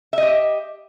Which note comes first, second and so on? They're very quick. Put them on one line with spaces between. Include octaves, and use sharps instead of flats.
E5 D#5 G4